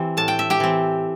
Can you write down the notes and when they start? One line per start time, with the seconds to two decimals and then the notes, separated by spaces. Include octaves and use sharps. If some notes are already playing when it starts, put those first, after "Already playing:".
Already playing: E3 C4 G4
0.17 A2 A5
0.28 G5
0.39 E5
0.50 G4 G5
0.60 E3 C4